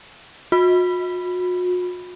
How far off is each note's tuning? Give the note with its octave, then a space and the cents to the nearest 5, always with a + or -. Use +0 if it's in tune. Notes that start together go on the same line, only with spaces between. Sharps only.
F#4 -45